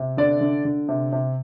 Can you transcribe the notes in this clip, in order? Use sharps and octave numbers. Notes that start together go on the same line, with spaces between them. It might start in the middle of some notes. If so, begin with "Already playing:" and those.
Already playing: C3
D3 D5
D3
D3
C3
C3